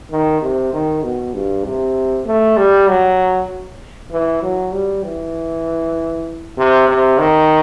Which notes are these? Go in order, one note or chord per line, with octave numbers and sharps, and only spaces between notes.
D#3
C3
D#3
B2
G2
C3
A3
G3
F#3
E3
F#3
G3
E3
C3
C3
D#3